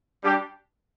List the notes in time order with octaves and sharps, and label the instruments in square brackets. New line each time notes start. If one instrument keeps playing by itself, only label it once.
[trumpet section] G3 D4 G4